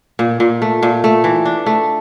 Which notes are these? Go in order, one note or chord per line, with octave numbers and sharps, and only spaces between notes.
A#2
A#2
A3
A#2
A3
E3
D4
A3